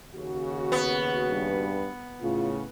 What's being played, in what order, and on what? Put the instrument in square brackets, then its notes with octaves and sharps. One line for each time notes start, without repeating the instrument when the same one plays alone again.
[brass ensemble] D#2 C#3 F#4
[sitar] B3
[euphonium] G2
[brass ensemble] A2 C#3 [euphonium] F4